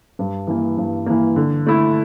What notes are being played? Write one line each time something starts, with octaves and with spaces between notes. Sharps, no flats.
G2
E3 A#3
G2
E3 A#3
D3
A3 E4